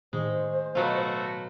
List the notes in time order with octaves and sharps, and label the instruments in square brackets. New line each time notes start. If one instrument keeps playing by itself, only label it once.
[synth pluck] A2 D#3 C#6 [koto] G#3 [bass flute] C5
[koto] B2 F#3 F4 [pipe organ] A3 F#4